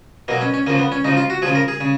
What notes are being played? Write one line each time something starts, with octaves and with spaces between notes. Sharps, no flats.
B2 F#3 A#3
C#4
C#4
C#3 F3 A#3
B3
C#4
C#3 F3 D#4
F4
F#4
C#3 F3 G#4
A#4
G#4
C#3